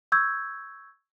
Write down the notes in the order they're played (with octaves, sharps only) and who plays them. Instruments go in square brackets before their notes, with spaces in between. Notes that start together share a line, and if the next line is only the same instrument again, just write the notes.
[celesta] C#6 E6 G6 G#6